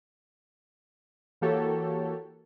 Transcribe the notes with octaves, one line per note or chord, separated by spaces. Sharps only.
E3 A#3 F#4 G4 A4 C#5